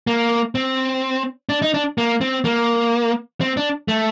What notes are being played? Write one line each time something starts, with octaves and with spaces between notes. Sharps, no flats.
A#3
C4
D4
D#4
D4
A#3
C4
A#3
C4
D4
A3